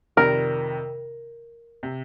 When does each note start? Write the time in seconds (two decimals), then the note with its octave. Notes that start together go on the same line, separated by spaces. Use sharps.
0.17 F2 C3 D#3 G3 A#4
1.83 C3